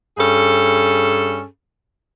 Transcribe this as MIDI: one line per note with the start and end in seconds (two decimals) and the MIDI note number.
0.17 1.44 43
0.17 1.44 61
0.17 1.44 68
0.17 1.44 69